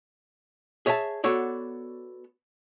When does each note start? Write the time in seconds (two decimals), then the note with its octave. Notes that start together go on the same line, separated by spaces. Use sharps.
0.86 G#4 C#5 E5 F#5 A5
1.24 B3 F#4 A4 C#5 D5